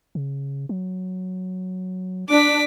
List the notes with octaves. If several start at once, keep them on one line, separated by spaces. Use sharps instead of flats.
C#3
F#3
D4 D6 B6